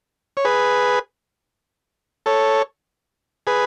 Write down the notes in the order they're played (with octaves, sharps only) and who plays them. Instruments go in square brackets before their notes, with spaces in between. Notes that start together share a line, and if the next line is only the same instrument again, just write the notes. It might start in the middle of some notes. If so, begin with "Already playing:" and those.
[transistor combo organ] C#5
G#4 B4
A4 C#5
G#4 B4